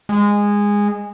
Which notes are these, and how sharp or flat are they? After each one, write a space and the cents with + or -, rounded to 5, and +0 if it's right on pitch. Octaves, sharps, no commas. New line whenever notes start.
G#3 -15